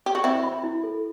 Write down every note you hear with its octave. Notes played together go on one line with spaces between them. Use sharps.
G4
F#4
C4 E4 E5
B5
E4
A4